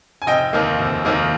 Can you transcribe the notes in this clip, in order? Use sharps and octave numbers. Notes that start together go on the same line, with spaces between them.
G#5
F1 D#5 G5
D#2 D#3 A#3
F1
D#2 D#3 A#3